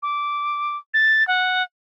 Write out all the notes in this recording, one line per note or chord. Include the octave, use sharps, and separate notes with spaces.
D6
A6
F#5